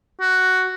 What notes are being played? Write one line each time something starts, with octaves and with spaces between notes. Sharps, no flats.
F#4